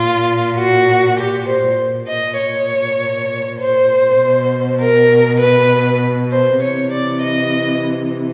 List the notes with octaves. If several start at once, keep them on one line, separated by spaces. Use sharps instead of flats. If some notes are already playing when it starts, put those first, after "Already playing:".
Already playing: A#2 F4
F#4
G4
C5
A#2
D#5
C#5
C5
B2
A#4
B4
C5
C3 E3 C#5
D5
D#5